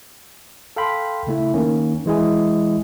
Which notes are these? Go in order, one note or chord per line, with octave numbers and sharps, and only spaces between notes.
A4 F5 G5 B5 C6
C#3 A3 E4
D#3 A#3 C#4
E3 G#3 E4 G#4